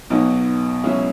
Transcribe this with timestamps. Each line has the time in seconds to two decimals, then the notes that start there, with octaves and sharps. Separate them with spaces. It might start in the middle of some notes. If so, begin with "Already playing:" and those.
0.10 B1 B2 F#3 B3 D#4
0.84 C#2 B2 F#3 C#4 E4